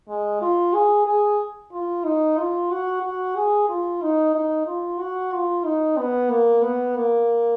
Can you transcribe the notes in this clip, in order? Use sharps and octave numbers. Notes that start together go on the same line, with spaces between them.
G#3
F4
G#4
G#4
F4
D#4
F4
F#4
F#4
G#4
F4
D#4
D#4
F4
F#4
F4
D#4
B3
A#3
B3
A#3